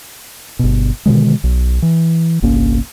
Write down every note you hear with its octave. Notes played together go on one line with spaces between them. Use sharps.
G1 B2
B2 D3 D#3 G#3
B1
E3
G1 C2 A#3 C#4